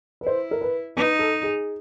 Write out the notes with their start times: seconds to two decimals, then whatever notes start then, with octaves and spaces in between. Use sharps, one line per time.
0.21 B4
0.26 E4 C5
0.51 A#4
0.61 B4
0.96 D#4 B4
1.19 A4
1.43 G#4